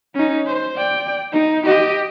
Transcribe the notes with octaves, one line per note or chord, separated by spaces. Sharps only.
C#4 D#4
C5
D5 G5
D#4
G4 D#5